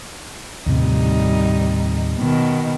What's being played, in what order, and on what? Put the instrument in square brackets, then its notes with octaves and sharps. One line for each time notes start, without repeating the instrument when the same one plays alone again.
[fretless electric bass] D#2 A2 C3 [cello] G3 D#4
[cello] B2 D#3